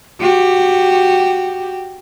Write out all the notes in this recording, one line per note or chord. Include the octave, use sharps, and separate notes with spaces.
F#4 G4